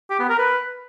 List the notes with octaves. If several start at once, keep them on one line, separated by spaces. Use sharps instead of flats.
G4
B3
A#4
B4